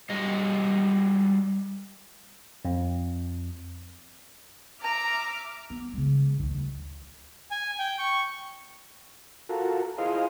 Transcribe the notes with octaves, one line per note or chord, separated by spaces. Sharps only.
F#3 G3 C#5 D#5
F2
E5 A#5 D6 F6
B3
C#3 G#3
D2 D#3
G#5
G5
C#6
F4 F#4 A4 A#4
E4 F4 G#4 C5 D#5 F5